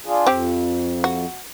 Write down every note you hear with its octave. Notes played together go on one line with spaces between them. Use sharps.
D4 F4 G#4
F2 C4 G4
F#4